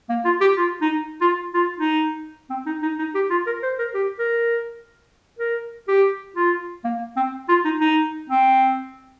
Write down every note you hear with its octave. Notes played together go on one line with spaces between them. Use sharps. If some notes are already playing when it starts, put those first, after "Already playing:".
A#3
F4
G4
F4
D#4
F4
F4
D#4
C4
D#4
D#4
D#4
G4
F4
A#4
C5
A#4
G4
A#4
A#4
G4
F4
A#3
C4
F4
D#4
D#4
C4